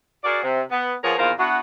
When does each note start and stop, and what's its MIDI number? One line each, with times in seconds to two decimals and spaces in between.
0.24 0.40 66
0.24 0.40 68
0.24 0.40 70
0.24 0.40 74
0.43 0.60 48
0.70 0.93 59
1.03 1.15 53
1.03 1.15 58
1.03 1.15 59
1.03 1.15 68
1.03 1.15 70
1.03 1.15 73
1.19 1.31 40
1.19 1.31 46
1.19 1.31 51
1.19 1.31 65
1.19 1.31 70
1.19 1.31 72
1.38 1.59 59
1.38 1.59 62
1.38 1.59 64
1.38 1.59 66